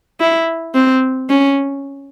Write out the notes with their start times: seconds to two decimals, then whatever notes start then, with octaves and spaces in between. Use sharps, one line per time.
0.20 E4
0.74 C4
1.29 C#4